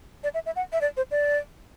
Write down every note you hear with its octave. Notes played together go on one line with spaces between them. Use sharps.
D5
E5
E5
F#5
E5
D5
C5
D5